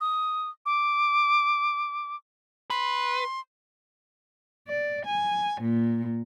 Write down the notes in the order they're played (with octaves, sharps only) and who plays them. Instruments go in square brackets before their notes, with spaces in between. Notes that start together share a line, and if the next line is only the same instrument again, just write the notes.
[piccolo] D#6
D6
[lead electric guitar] B4 [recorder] C6
[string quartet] D5
G#5
A#2